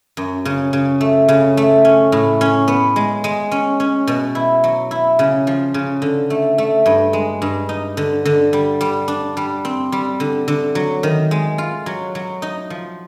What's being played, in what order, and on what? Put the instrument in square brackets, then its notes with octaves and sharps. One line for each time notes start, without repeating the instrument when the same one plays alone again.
[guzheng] F#2
C#3
C#3
A3
C#3
A3
C#4
A2
C#4
B3
G#3
G#3
C#4
C#4
B2
E4
F#3
E4
C#3
F3
C#3
D3
A3
A3
G2
G#3
G2
D#4
D3
D3
G3
G3
D4
G3
C4
G3
D3
D3
F#3
D#3
G#3
F4
F#3
F#3
D#4
F3